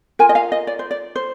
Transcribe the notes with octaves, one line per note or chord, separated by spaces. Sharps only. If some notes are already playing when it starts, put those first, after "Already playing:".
F4 A#4 G#5
D#5
F5
D#5
D5
C5
D5
C5